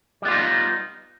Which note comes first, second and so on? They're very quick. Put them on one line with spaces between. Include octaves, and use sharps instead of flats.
G3 B3 F4 D#4